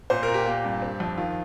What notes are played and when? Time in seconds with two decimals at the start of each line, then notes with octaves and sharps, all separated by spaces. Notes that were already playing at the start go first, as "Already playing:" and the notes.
0.10 A#2 C5
0.23 A#4
0.28 A#2
0.34 G4
0.46 A#3
0.65 G2
0.82 C4
1.00 F2
1.18 D#3 F4